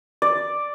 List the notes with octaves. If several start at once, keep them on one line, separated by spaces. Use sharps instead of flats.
D5